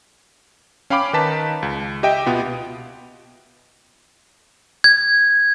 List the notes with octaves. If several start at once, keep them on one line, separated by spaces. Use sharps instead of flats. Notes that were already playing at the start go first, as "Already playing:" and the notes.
C#4 F5 G5 B5 D6 D7
D#3 D#4 B4 A5 B6
C#2
G4 D#5 E5 G5
B2 B3 F4
G#6